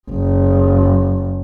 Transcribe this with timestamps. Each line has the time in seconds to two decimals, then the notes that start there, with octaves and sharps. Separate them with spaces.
0.10 F#1